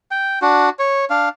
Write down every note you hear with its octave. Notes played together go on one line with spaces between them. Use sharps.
G5
D4 F#4
C#5
D4 F5